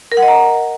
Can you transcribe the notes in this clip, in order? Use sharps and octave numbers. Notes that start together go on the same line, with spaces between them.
A#4
F#5
D#5
A#5